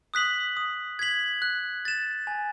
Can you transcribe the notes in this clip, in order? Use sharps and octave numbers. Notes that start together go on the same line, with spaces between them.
D#6 F#6 B6 F#7
D#6
G#6 B6 F#7
F#6
A6 E7
G#5